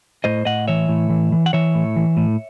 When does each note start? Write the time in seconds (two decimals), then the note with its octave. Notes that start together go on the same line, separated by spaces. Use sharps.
0.24 A2 C5 D#5
0.45 A2 D#5 F#5
0.68 E3 C#5 E5
0.89 A2
1.10 E3
1.32 E3
1.46 F#5
1.53 E3 C#5 E5
1.75 A2
1.96 E3
2.17 A2